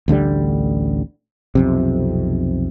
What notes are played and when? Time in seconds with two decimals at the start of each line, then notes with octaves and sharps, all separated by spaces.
0.08 A1 D2 D3 G3
1.55 B1 F2 C3